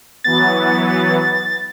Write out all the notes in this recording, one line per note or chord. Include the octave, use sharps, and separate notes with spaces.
E3 F#3 B3 A6